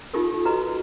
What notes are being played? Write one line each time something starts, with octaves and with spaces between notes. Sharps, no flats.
D#4 F4 G4 A4 A#4
F#4 B4 D#5 A#5